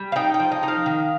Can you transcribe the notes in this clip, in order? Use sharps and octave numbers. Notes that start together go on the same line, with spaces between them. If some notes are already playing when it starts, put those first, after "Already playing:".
Already playing: G3
F5
D#4 G5
G5
F3
D#5
D#4
F5
D#3